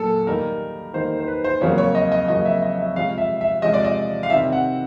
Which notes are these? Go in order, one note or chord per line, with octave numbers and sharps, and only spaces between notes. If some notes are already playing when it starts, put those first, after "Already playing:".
Already playing: A#2 F#3 A#3 A4
D#3 G3 A#3 D#4 A#4
D#3 G3 A#3 D#4 C5
C5
B4
C5
F2 C#3 F#3 A#3 C#5
C#5
D#5
D#5
F2 C#3 F#3 A#3 D#5
E5
D#5
E5
C3 F3 G#3 C#4 F5
E5
E5
C3 F3 G#3 C#4 D#5
D5
D#5
F5
C3 D#3 G3 C4 E5
F#5